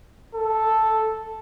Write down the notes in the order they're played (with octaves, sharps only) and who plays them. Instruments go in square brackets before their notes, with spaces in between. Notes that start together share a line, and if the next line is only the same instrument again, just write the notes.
[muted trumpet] A4